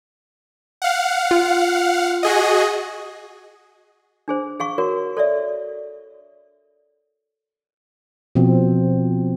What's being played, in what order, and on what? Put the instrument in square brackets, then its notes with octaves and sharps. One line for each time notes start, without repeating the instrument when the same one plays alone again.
[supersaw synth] F5 F#5
[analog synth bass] F4
[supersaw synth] F#4 G#4 D#5
[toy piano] D4 G#4 C5
G#4 F5 C#6
F#4 A#4 C#5
A4 C#5 D5 E5
[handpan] B2 F3 C4